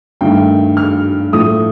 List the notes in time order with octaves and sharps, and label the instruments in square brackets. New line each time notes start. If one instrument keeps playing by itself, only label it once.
[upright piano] G2 D#3 A3 G5
F6
A2 F3 A3 D#6